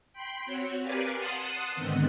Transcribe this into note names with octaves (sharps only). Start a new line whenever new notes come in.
G5 B5 C6
C4 F#4 C#5
G4 A#4 B4 D5 F5 G#5
F#5 A5 C6 D#6 F#6
G#2 D3 D#3 B3 C4